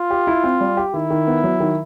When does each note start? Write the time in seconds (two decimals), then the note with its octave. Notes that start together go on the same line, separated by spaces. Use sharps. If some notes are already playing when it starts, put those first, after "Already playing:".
Already playing: F4
0.11 G4
0.27 E4
0.44 C4
0.61 G3
0.77 G4
0.94 D#3 E4
1.10 D#3
1.27 B3
1.44 F#3
1.60 D#3